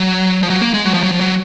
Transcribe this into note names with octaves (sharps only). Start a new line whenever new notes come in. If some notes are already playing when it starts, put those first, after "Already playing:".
Already playing: F#3
F3
F#3
A#3
G#3
F#3
F3
F#3
F3
F#3